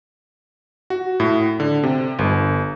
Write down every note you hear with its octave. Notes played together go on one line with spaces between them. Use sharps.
F#4
A2
D3
C3
G1